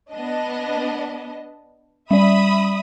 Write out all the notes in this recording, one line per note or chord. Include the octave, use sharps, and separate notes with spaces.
B3 D4 D#5
G3 D5 E5 B5 D#6